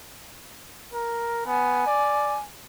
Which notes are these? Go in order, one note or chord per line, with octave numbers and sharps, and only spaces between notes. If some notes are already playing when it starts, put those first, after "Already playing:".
A#4
B3 G#5
D5